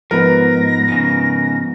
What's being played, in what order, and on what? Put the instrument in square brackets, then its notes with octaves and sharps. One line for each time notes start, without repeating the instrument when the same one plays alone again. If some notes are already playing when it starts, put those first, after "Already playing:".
[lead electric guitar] G#2 [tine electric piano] F3 B3 [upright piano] A#4 B4 [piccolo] A#6
[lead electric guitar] G#2 C#3